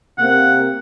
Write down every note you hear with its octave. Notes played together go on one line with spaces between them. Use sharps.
C3 A#3 C4 F#5